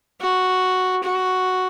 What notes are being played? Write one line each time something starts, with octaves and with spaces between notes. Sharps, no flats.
F#4
F#4